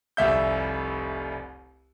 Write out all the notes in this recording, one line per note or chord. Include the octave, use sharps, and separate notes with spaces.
F1 C2 E5 G6